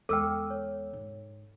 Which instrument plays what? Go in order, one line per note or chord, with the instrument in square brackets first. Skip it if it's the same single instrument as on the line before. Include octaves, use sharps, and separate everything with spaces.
[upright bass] E2 G#3 [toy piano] A4 G5 [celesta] D6 E6 F6
[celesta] C#5
[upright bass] G#2